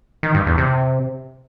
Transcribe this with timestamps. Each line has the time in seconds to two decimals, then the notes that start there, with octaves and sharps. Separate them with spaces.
0.23 D#3
0.35 G2
0.46 E2
0.58 C3